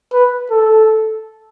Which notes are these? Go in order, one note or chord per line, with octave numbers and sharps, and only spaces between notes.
B4
A4